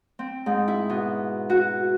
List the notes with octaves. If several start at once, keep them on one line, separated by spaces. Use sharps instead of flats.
C4
G#2
E4
B2
F#4